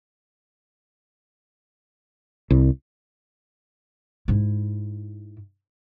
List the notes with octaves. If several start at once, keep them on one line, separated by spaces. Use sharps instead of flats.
C2
G#2 E4